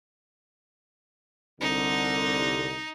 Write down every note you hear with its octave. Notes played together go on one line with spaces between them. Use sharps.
C2 D3 D#4